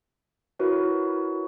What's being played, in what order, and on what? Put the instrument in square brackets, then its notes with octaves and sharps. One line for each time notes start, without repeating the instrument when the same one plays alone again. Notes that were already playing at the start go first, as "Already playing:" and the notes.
[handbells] E4 F#4 A#4 B4 C#5